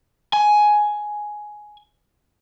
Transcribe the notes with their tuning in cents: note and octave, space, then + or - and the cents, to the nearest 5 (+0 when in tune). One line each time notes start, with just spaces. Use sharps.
G#5 +10